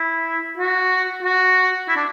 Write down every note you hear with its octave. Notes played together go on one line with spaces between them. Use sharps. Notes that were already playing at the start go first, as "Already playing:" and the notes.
Already playing: E4
F#4
F#4
E4
D4